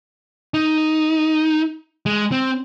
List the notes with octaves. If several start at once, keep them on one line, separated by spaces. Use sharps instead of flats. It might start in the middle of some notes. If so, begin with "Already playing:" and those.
D#4
G#3
C4